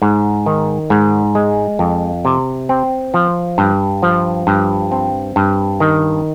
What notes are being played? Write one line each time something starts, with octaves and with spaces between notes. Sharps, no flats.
G#2
D#3
G#2
G#3
F2
C3
C4
F3
G2
F3
G2
C4
G2
D#3